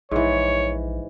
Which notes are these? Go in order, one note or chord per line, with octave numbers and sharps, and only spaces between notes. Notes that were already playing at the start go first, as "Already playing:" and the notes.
A#1 G#2 E3 C#5